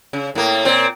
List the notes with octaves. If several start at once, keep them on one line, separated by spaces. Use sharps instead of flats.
C#3
A2 A#3
A#2 C4